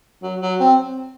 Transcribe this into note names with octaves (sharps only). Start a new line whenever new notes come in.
F#3
F#3
C4